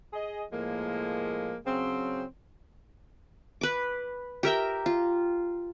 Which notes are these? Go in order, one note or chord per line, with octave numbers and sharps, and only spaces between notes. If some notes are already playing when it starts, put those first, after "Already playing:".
G#4 D#5
A2 F3 G#3 A#3
C#3 F#3 C4
B4 D6
G4 A#4 E5 G5
F4